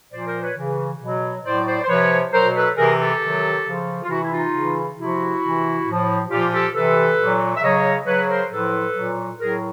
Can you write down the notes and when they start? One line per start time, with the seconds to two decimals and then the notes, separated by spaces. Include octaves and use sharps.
0.12 A#2 F3 C5 D5
0.26 A#4 C5
0.41 B4 C#5
0.57 C#3 E3
1.01 B2 F#3
1.45 A2 F#3 C5 D5
1.67 C5 D5
1.82 C5
1.89 C3 F3 B4 C#5
2.33 B2 F#3 A#4 C5
2.55 A4 B4
2.77 C3 E3 G#4 A#4
2.99 G4 A4
3.21 C3 D#3 F#3
3.65 C#3 F3
4.03 F4
4.09 C3 E3 E4 F#4
4.22 E4
4.31 D#4 F4
4.53 C#3 E3
4.97 C3 F3 E4 F#4
5.42 C3 E3
5.86 A2 F3
6.30 A#2 F3 F4 G4
6.52 G4 A4
6.74 C3 E3 A4 B4
7.18 A#2 F#3
7.56 E5
7.63 C#3 F#3 C#5 D#5
8.06 C#3 F#3 B4 C#5
8.29 A#4 C5
8.51 A2 F3 A4 B4
8.95 A#2 F#3
9.39 A2 F#3 G#4 A#4